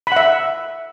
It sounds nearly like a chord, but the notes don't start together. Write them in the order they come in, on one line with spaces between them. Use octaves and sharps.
B5 F#5 E5